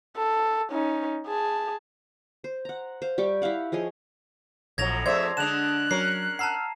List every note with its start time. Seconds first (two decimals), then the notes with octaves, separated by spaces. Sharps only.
0.17 A4
0.71 C#4 D#4
1.27 G#4 A5
2.44 C5
2.65 F#5 A#5
3.02 C5 F5
3.18 G3 G4 C#6
3.42 E4 G4 F5 F#5
3.72 F3 G#4 C#5 D#5
4.78 A#1 F2 A2 F#3 G#6 A#6 F7
5.06 F2 A3 G#4 C5 D5 E5 C6 G#6
5.37 D3 G#3 D4 A5 F#6 E7 F7
5.91 F#3 C#4 A#4 C7
6.39 F#5 A5 A#5 E6 F6 C7